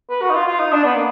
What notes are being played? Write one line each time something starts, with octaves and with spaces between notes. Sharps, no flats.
B4
F#4
D#4
F4
F4
D#4
D4
B3
A#3